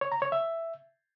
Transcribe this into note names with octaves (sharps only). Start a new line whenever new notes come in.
C#5
A#5
C#5
E5